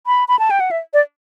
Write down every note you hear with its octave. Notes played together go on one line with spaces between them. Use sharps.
B5
B5
A5
G5
F#5
E5
D5